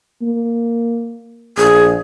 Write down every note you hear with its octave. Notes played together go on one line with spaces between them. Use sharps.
A#3
A#1 G#4